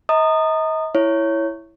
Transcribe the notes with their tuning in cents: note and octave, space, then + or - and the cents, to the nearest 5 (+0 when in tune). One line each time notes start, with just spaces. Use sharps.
D#5 +35 A#5 -25 D#6 -20
E4 +0 C#5 +0